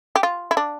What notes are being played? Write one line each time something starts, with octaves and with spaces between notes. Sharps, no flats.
G4
F4
E4
D4